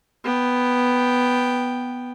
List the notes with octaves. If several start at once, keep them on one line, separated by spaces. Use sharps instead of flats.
B3 G5